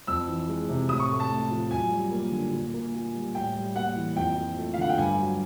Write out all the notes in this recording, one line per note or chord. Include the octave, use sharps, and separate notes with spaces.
F2 E6
E3
G#3
C3
A2 D#6
C#6
A3
A5
A2
F3
F#2 G#5
G3
A#3
D3
A#2
A#3
A#2
G3
A2 G5
G3
A#3 F#5
E3
F2 G5
F3
A3
F5
D3 F#5
G5
G2 G#5
F#3